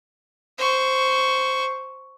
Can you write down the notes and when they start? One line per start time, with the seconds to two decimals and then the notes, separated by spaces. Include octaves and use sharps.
0.58 C5 C#6